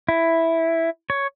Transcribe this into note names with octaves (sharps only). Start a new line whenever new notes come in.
E4
C#5